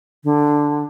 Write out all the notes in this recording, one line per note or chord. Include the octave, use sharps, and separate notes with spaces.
D3